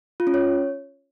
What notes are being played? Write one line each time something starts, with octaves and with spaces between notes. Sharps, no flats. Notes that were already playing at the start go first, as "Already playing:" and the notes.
F4
C#4
C#5